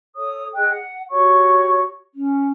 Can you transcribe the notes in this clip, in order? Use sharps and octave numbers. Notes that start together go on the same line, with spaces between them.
A4 C#5 D#6
G#4 D#5 G5 F#6
F#5
F#4 G4 C#5 C#6
C#4